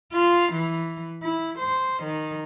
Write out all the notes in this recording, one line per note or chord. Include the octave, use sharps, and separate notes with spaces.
F4
E3
E4
C5
D#3